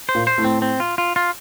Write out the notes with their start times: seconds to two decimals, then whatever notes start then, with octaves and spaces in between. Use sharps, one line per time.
0.09 C5
0.14 A#2 A#3
0.27 C5
0.38 A2 A3
0.45 C4
0.62 C4
0.80 F4
0.98 F4
1.16 F4